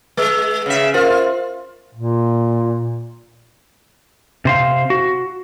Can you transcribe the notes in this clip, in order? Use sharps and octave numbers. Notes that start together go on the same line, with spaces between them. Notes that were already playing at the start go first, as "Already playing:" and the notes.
G#3 B4 E6
C#3 E5
F4 A#4 C5
A#2
C3 C5 F5
F#4